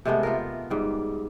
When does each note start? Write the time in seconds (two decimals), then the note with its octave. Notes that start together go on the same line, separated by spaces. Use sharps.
0.05 C3 G#3 A3 B3
0.23 B3 F4 A#4
0.70 G#2 G3